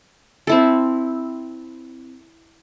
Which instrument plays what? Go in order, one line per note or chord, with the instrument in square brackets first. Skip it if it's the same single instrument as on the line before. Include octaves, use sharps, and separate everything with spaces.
[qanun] C4 E4 A4